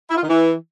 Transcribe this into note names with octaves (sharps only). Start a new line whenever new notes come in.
E4
F4
D#3
E3